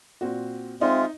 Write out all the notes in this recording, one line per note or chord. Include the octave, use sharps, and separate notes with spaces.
A#2 C4 F#4
G#3 C4 D#4 F4 E5